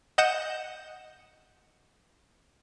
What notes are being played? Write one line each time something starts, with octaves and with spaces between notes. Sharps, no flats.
D#5 F#5 G6 E7